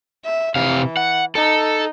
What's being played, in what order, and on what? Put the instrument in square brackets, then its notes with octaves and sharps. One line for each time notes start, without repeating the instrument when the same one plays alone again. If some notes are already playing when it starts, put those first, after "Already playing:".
[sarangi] E5
[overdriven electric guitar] C3 F5 [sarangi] E3
[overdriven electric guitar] F#5
[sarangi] D#4 [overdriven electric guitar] A4